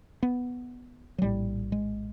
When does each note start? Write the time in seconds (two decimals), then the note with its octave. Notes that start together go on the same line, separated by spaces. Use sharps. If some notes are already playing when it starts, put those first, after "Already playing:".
0.23 B3
1.18 F#3
1.22 A#1 A2 G3
1.72 G#3